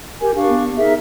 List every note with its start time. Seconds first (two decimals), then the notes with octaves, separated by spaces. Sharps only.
0.21 G4 A#4 G#5
0.35 D4 G4 F5 C#6
0.49 B3
0.77 D#4 G#4 A#4 E5